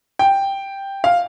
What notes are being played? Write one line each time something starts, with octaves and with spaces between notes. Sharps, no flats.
G5
F5